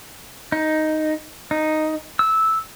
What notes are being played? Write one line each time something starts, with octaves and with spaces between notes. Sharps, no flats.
D#4
D#4
E6